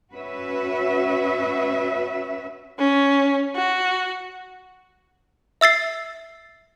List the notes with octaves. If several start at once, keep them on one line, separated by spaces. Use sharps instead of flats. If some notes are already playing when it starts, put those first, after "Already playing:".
C#4 F#4 B4 E5
C#4
F#4
E5 E6 A6 C7